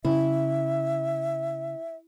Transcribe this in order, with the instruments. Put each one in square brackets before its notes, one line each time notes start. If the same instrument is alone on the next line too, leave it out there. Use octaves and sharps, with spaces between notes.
[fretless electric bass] C#3 [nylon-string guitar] E4 [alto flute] E5